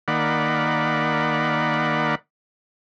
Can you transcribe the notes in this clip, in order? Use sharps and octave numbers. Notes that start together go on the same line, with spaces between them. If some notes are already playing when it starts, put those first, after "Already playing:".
D#3 A#3 D5 F#5 B5